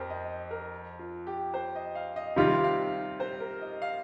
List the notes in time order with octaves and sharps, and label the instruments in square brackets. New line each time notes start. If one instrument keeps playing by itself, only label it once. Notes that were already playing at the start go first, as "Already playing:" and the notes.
Already playing: [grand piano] F2 [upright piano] G4 A#4 C5
[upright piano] D#5
A#4
F4
G4
C5
D#5
F5
D#5
[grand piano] C3 D#3 G3 C4 F4 [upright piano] F5
[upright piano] F5
C5
A#4
D#5
F5